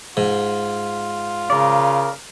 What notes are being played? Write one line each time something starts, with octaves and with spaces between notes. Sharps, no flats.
G#2 F4
C#3 A#4 D5